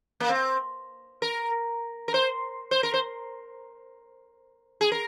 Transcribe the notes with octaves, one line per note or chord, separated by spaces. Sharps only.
A#3
C4
A#4
A#4
C5
C5
A#4
C5
G#4
A#4